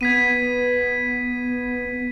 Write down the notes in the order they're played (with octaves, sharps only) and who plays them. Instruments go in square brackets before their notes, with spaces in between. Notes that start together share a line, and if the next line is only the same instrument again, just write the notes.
[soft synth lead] B3 [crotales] G#6 B6 D#7